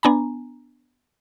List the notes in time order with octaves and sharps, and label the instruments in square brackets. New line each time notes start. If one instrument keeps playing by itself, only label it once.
[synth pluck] B3 D4 G#5 A#5